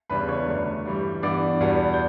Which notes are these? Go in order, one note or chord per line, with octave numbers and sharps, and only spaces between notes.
E2 C#3 G3 D4 B4 B5
C#5 C#6
F#2 D3 A3
G2 E3 G3
G2 E3 B3 D4 D5 D6
E2 B2 G3 B3
G6